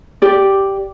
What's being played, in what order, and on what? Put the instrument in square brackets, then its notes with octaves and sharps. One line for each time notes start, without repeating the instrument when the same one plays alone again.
[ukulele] G4 D5